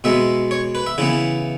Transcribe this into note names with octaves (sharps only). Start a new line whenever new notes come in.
B2 G#3 B3 E5
C#5
B4
E5
C#3 E3 B3 E4